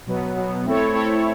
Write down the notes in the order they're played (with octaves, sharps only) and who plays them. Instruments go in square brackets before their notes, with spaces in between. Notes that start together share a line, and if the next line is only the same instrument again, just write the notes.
[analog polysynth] B2 F#3 B3
B2 F#3 B3
A3 C4 E4 A4 C#5
A3 C4 E4 A4 C#5